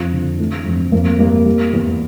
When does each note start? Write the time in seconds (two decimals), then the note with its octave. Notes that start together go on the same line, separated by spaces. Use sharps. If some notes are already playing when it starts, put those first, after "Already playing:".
Already playing: F2 F4
0.13 D3
0.39 E3 A3
0.66 F2
0.92 F2 A#3
1.19 G3 A#3
1.46 G3
1.73 E2